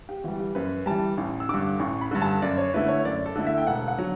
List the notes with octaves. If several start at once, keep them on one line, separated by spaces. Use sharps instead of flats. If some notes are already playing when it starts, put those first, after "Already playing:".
G4
E3 G3 F#4
G4
F#2 B4
E3 G3 A5
A1
E6
G2 D3 D6
A1 C#6
B5
G2 D3
A5
F#2 D5
C#5
D3 A3 E4 B4
C#5
F#2 D5
A4
D3 A3 E4
E5
G5
E1 F#5
F#5
D3 F#3